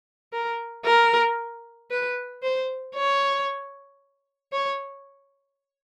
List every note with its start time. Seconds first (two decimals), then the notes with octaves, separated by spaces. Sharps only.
0.33 A#4
0.85 A#4
1.91 B4
2.43 C5
2.95 C#5
4.52 C#5